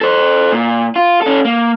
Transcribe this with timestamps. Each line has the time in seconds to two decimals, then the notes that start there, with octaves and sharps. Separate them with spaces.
0.01 A4 C5
0.52 A#2
0.96 F4
1.22 C#4 A4
1.45 A#3